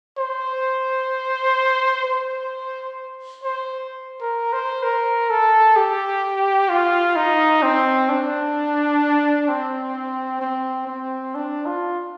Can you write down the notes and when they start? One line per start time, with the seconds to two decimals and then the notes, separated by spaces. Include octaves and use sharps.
0.18 C5
2.05 C5
3.44 C5
4.21 A#4
4.53 C5
4.83 A#4
5.30 A4
5.76 G4
6.70 F4
7.16 D#4
7.63 C4
8.09 D4
9.48 C4
10.41 C4
10.88 C4
11.35 D4
11.66 F4